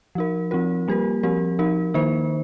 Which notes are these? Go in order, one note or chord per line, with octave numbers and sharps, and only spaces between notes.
F3 D#4 A#4
F3 C4 F4 A#4
G3 A#3 G4 A#4
F3 C4 G4 A#4
F3 D#4 A#4
D#3 A#3 D#4 C5